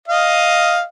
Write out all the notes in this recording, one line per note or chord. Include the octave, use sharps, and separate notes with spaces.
D#5 F5